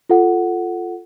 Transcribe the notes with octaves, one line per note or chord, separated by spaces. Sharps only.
F4 A4 F#5